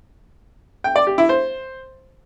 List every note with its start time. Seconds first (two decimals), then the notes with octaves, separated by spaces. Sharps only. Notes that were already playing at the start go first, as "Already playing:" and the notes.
0.84 G5
0.96 D5
1.07 G4
1.18 E4
1.29 C5